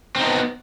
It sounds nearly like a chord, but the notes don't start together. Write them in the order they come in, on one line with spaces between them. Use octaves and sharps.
C4 D#4 B3